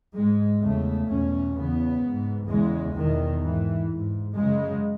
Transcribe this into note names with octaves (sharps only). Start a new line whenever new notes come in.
G#2 G#3
E2 C#3 A3
E2 B2 C#4
E2 C#3 B3
G#2
E2 C#3 G#3
E2 B2 D#3
G#2 E3
G#2
F#2 C#3 G#3